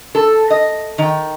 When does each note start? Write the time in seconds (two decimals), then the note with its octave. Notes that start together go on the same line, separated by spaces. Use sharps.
0.15 A4
0.50 D#5
0.98 D#3 G5